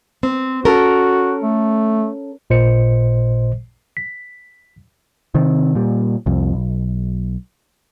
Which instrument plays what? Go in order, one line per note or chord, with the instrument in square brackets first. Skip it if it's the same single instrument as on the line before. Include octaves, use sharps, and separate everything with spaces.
[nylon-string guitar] C4
[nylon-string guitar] C#4 A4 A#4 [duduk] F#4
[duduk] A3
[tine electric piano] A1 A#2 C5 D#5 C#7
B6
[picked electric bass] C3 D#3 C4
A#2 G3
C2 F2
B1